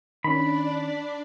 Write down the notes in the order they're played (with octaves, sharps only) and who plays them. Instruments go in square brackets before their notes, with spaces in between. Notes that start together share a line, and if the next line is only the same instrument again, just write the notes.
[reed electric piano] D#3 C#4 [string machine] D4 D5 [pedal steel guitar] B5